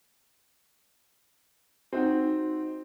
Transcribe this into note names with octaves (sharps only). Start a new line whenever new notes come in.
C4 D#4 F#4